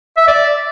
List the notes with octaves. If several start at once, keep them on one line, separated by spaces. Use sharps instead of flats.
E5
D5